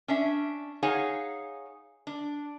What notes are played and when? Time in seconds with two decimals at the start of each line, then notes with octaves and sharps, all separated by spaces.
0.08 C#4 D4 E5
0.83 D#4 G#4 C#5 F5 F#5 G#5
2.07 D4